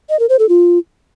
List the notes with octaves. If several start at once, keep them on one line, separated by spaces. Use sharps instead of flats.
D#5
A#4
C5
A4
F4